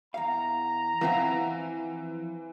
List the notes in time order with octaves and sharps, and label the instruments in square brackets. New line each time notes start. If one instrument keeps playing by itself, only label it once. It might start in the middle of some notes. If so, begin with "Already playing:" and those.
[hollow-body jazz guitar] E2 F5 [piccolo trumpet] A#5
[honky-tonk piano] E3 [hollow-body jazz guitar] F3 C4 E4 [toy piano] F5 F#5